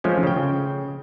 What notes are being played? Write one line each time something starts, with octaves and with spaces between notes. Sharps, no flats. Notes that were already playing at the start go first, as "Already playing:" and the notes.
F3 G#3 A3 C#4
C#3 G5